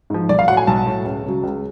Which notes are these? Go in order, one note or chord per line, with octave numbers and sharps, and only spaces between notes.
G#2 F3
B1 D5
F5
A2 F#3 F#5
G#5
B1 A5
A2 F#3
C#2
C#3 F#3
C#2